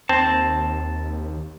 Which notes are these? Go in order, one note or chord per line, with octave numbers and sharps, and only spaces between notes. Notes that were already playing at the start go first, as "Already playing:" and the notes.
D#2 C4 A5